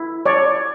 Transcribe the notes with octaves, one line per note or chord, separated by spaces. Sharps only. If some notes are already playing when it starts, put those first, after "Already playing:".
Already playing: E4
C#5 D5